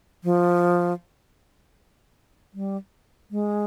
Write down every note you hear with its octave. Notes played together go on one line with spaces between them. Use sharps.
F3
G3
G#3